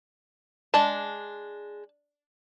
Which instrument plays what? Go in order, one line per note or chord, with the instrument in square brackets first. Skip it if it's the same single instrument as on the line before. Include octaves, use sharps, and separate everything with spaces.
[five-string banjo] G#3 D4 A5